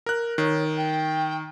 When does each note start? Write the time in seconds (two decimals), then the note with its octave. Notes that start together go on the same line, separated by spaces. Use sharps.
0.06 A#4 F#6
0.38 D#3 C#5
0.77 G5